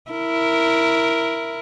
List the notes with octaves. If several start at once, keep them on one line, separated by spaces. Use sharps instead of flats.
E4 A#4